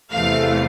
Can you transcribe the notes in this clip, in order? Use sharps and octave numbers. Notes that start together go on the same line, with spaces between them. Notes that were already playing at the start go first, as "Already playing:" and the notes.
E2 C3 E3 A3 F5